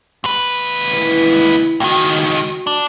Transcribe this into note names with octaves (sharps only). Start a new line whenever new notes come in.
D#2 B4
E3
C#2 D#3 F#4 G5
D4